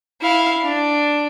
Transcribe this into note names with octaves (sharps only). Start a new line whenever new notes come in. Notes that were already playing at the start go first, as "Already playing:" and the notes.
E4 F5
D4